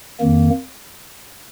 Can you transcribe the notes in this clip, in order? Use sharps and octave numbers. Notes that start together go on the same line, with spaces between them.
F2 D#3 A#3